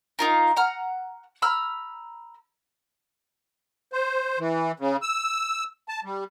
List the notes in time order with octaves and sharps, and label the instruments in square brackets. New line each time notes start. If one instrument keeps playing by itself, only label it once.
[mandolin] D#4 F4 A#4
F#5 A#5 F6
A#5 B5 E6 F6
[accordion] C5
E3
C#3
E6
A5
G3